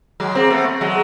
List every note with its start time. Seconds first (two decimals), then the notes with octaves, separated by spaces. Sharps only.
0.20 F#3 G#3
0.35 A#3 C4
0.50 A3 B3
0.81 F#3 G#3